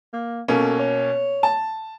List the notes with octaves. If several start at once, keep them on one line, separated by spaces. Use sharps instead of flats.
A#3
B2 A#3 C#4 A4
C#5
A5